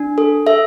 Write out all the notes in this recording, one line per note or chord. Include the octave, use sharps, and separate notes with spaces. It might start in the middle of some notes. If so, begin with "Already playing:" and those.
Already playing: D4
A4
A4 E5